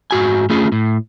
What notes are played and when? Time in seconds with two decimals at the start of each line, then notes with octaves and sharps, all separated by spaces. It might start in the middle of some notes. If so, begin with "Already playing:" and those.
0.11 G#2 F#4 G#5
0.50 A3 C#4 F4 G#4
0.72 A2